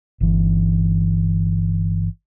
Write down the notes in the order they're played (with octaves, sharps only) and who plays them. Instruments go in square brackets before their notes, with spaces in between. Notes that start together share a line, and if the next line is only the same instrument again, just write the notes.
[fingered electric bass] G1 E3